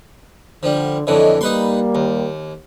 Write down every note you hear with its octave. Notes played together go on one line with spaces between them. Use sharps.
D3 F3 G3
F2 D3 E3 C#5 D#5
G3 A#3 D#4 B4 C6
D#2